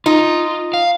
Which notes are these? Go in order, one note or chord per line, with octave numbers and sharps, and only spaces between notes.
D#4 F4
F5